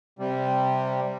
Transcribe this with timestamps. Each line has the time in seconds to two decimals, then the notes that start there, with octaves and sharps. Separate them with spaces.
0.19 C3 G3